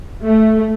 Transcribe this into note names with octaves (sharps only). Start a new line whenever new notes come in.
A3